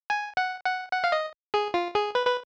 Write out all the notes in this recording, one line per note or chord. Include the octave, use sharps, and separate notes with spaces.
G#5
F#5
F#5
F#5
F5
D#5
G#4
F4
G#4
B4
B4